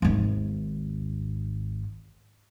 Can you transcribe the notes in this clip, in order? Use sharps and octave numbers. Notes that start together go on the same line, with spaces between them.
G#1 D#2